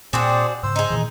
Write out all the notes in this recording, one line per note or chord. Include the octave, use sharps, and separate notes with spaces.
A#2 C4 D4 F#4 G#4 C5 D5
G#2 C#3 C5 E6
D#4 G#4
A#2 D#3 E3